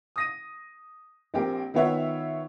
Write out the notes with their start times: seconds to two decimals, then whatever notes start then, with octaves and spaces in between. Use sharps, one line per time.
0.16 D#6 A#6 D#7
1.34 A#1 C4 G4 A#4
1.74 D#3 B3 F4 C#5 E5 F#5